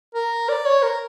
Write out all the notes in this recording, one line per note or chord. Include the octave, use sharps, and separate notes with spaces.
A#4
D5
C#5
A#4